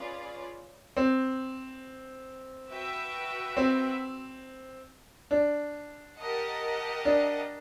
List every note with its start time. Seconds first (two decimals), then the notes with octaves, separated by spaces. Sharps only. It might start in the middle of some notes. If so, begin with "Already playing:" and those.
Already playing: C#4 F4 G#4 B4 D5
0.97 C4
2.70 F#4 B4 E5 G5
3.57 C4
5.31 D4
6.18 G4 A#4 D#5 F#5 A5
7.05 D4